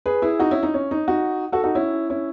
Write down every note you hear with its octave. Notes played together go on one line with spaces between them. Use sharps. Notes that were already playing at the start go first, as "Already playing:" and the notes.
G#4 B4
E4 G#4
D#4 F#4
C#4 E4
D#4
C#4
D#4
D#4 F#4
F#4 A4
D#4 F#4
C#4 E4
C#4 E4